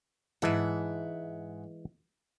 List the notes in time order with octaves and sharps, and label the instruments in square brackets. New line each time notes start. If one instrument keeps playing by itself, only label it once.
[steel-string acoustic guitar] G#2 E5 F#5 [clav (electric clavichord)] E3 G#3 A5